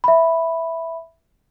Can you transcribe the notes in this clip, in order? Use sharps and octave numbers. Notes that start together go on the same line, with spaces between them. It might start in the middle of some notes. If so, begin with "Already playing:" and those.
E5 B5